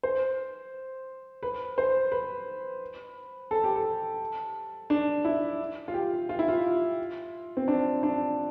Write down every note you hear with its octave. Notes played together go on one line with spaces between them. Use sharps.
C5
B4
C5
B4
A4
G4
A4
D4
E4
F4
G4
F4
E4
F4
C4
D4
D4